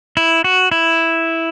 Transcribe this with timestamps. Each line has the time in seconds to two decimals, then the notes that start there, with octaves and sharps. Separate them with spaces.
0.17 E4
0.44 F#4
0.72 E4